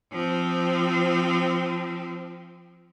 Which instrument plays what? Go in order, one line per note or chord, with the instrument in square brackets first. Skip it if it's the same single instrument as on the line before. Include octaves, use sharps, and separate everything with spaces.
[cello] F3 C4